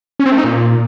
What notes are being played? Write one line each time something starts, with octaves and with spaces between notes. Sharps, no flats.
C#4
C4
A3
D#4
A#2